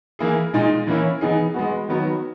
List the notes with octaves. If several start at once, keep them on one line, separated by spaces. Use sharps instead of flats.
E3 A#3 E4 G#4
A#2 G#3 D#4
E3 A#3 C#4 E4
E3 B3 D#4 G#4
G#3 B3 F#4
D#3 F#3 B3 F#4